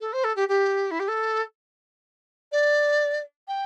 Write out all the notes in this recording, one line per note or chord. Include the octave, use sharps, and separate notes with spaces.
A4
C5
A4
G4
G4
E4
G4
A4
D5
G5